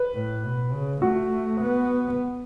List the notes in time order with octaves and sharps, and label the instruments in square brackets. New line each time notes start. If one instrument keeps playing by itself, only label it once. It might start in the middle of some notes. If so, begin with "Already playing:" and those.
Already playing: [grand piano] B4
[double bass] A2
B2
C#3
[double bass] A3 [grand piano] F#4
[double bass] B3